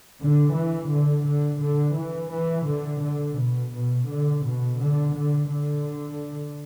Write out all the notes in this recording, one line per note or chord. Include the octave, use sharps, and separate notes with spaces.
D3
E3
D3
D3
D3
E3
E3
D3
D3
B2
B2
D3
B2
D3
D3
D3